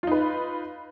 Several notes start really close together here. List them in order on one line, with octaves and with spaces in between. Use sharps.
F4 D#4 B4